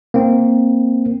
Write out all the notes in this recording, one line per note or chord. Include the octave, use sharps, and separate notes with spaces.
A#3 C4